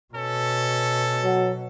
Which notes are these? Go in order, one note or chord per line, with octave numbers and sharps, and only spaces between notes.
B2 C#4 A4
F#3